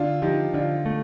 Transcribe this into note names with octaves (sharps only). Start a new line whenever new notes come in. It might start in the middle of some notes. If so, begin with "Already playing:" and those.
Already playing: D3 D4 F4
F3 D#4 G4
D3 D4 F4
A3